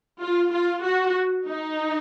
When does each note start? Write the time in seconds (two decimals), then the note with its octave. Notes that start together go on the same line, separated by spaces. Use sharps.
0.22 F4
0.53 F4
0.85 F#4
1.48 D#4